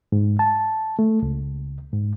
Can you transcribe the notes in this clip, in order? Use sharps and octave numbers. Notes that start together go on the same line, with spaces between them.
G#2
A5
A3
C#2
G#2